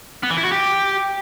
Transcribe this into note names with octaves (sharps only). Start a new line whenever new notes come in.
B3
E3
E4
F#4
G4